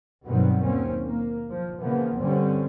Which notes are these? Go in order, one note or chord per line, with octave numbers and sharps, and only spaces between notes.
G2 B2 D#3 F#3 B3 C4
D#2 C4 C#4
A#3
F3
C#3 E3 F3 A#3 B3
D2 G2 D3 G3 C4 C#4